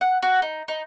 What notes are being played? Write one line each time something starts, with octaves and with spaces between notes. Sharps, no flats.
F#5
F#4
D#4
D#4